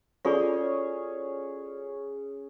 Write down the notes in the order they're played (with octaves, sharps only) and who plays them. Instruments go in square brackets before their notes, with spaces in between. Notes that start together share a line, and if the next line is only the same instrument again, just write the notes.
[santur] C#4 G#4 C#5 [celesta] F4 A4 D5